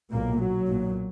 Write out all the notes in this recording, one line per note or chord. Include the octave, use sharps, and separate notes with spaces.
B1 A#2 A#3
F#3
B1 A#2